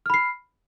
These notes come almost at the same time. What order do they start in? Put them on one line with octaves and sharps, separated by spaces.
F6 B5 C7